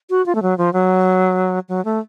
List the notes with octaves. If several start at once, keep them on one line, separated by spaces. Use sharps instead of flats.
F#4
F4
A3
F#3
F3
F#3
F#3
A3